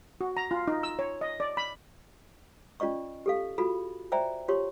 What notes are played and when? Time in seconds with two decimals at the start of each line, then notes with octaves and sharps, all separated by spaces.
0.21 F#4
0.37 A#5
0.51 F4
0.68 D#4
0.83 E6
0.99 C#5
1.21 D#5
1.40 D5
1.57 B5
2.80 C#4 F4 D5 D#5 C#6
3.26 G4 A4 F5
3.58 F4 F#4 A4 B5
4.12 C5 D5 E5 G5 G#5 A#5
4.48 F4 G4 C#5 C6 C#6